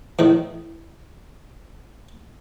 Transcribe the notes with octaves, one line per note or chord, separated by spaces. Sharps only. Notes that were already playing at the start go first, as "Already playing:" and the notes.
E2 A2 D#3